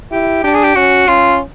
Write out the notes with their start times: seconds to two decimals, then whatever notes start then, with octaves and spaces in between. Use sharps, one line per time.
0.11 E4 G4
0.43 D4 G4
0.54 G#4
0.63 G4
0.76 C#4 F#4
1.08 C#4 F4